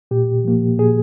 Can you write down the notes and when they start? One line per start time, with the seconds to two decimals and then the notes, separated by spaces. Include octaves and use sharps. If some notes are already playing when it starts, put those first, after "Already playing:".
0.11 A#2 G4
0.44 F3 A#3
0.78 A#2 G#4